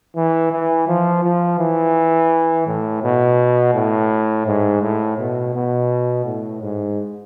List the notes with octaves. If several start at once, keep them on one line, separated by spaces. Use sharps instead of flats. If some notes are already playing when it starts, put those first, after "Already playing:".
E3
E3
F3
F3
E3
A2
B2
A2
G#2
A2
B2
B2
A2
G#2